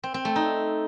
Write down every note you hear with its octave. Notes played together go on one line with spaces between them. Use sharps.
C4
C4
A3
D#4